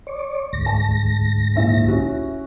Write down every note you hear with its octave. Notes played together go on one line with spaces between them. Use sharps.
C#5 D5
D2 G#2 A#6
A5
A#1 E4 E5
C#4 E4 F#4